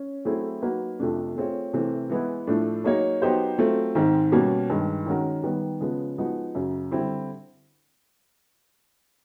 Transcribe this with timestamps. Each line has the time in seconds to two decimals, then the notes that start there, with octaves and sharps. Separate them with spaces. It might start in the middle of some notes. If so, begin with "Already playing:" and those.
Already playing: C#4
0.25 F#3 A3 C4 E4 G#4
0.62 F#3 A#3 D#4 F#4 B4
1.00 F2 C3 F3 A3 D4
1.35 A3 C4 F4 G#4 C#5
1.73 C3 E3 A3 C4
2.10 E3 G#3 B3 E4
2.47 A2 F3 A3 D4
2.84 F#3 A#3 D#4 G#4 C#5
3.22 F#3 B3 D#4 G4 C5
3.58 F#3 A3 C4 F4
3.95 G#2 D#3 G#3 C4
4.32 B2 G3 A#3 C#4
4.70 G2 D#3 G#3
5.06 D#3 G#3 C#4 F#4 A#4
5.43 D#3 G3 B3
5.81 C#3 F3 G#3 B3
6.18 F3 G#3 B3 D#4 F#4
6.55 F#2 C#3 F#3
6.91 D3 G3 C4 E4